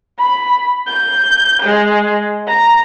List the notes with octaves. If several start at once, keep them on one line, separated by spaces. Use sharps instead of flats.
B5
G6
G#3
A#5